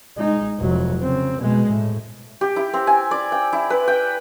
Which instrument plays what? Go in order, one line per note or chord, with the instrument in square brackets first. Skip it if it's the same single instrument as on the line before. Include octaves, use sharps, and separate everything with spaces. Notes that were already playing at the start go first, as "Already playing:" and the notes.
[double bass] G#3 D#4
F1 F#3
C#3 C4
B2 G#3
A2
[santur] G4
E4
C4
G#5
D5
G5
E4
B4
G5